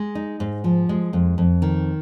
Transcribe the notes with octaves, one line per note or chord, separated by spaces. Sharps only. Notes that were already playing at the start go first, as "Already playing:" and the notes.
Already playing: G#3
D#4
G#2
F3
G#3
F2
F2
D#3